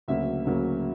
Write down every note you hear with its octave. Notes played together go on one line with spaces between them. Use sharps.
D2 C#3 F#3 A#3 E5
D2 C#3 F#3 A#3